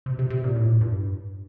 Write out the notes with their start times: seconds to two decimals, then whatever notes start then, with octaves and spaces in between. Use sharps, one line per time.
0.06 C3
0.19 C3
0.30 C3
0.44 A#2
0.56 A2
0.64 A#2
0.71 A2
0.81 G2